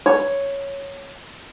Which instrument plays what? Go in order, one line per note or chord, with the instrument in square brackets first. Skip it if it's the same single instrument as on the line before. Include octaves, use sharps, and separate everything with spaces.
[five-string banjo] C#5